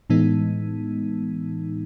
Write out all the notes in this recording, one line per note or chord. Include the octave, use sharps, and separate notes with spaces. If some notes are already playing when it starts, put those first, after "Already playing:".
A2 E3 G#3 B3 D#4